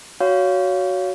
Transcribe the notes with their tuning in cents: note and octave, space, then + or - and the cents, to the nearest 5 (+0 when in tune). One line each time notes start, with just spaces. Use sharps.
F#4 +5 C#5 +20 F5 -5